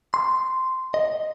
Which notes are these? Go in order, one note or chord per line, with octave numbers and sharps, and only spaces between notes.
C6
D#5